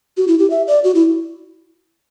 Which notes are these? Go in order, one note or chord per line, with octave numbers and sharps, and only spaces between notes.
F#4
E4
G4
E5
D5
F#4
E4